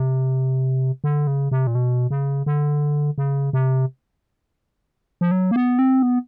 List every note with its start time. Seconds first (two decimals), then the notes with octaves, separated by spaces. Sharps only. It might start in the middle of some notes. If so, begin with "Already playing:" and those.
Already playing: C3
1.04 D3
1.27 C#3
1.52 C3
1.67 A#2
1.75 B2
2.10 C#3
2.46 D3
3.18 C#3
3.53 C3
5.21 F3
5.31 F#3
5.51 A#3
5.56 B3
5.79 C4
6.03 B3